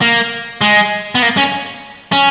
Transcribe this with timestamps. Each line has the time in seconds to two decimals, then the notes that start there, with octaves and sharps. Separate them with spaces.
0.01 A#3
0.61 G#3
1.15 B3
1.22 A#3
1.37 C#4
2.12 C#4